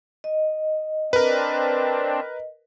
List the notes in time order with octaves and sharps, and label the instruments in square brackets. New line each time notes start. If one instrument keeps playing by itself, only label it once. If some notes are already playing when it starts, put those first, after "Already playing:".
[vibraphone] D#5
[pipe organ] C4 D4 [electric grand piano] A#4 B4